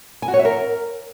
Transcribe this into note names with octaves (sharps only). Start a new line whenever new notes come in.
G#5
F#4
C#5
E5
A#4